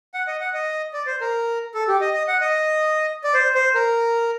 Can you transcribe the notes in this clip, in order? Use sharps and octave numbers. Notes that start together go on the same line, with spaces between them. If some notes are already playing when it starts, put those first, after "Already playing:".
F#5
D#5
F#5
D#5
D5
C5
A#4
A4
G4
D#5
D#5
F#5
D#5
D5
C5
C5
A#4